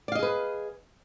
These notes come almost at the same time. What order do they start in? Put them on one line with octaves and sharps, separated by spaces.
D5 F5 D#5 G#4 B4